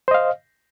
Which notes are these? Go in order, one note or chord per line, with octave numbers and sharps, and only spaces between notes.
C5 D#5 F5